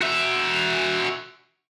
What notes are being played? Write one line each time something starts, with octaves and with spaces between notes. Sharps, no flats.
F#4 E5